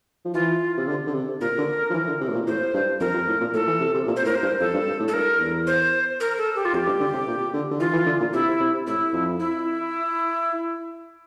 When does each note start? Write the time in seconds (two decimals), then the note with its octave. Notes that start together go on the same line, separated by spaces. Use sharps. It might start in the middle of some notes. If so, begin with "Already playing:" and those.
0.25 F3
0.34 E3 F4
0.78 C3
0.87 D3
1.07 D3
1.14 C3
1.41 A#2 A#4
1.58 D3
1.90 F3
1.94 E3
2.07 D3
2.21 C3
2.29 A2
2.34 A#2
2.47 A2 C5
2.74 G2
3.00 F2 A#4
3.14 F2
3.27 A2
3.41 A#2
3.54 A2 A4
3.67 E3
3.80 C3
3.94 C3
4.07 A#2
4.16 C5
4.25 A2 A#4
4.35 C5
4.42 G2
4.60 F2 A4
4.74 G2
4.87 G2
5.00 A2
5.08 A4
5.13 G2 A#4
5.40 E2
5.67 C5
6.20 A#4
6.38 A4
6.55 G4
6.65 F4
6.73 F2 G4
6.87 G2
7.00 D3
7.13 C3
7.27 A#2
7.53 D3
7.71 D3
7.80 E3 F4
7.93 E3
8.06 D3
8.20 A#2
8.33 C3 E4
8.60 C3
8.87 A2 E4
9.13 F2
9.40 E4